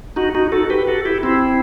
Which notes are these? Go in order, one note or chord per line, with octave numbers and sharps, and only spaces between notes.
D#4 F#4
D#4 F#4
F#4 A4
G4 B4
F#4 A4
E4 G4
C4 E4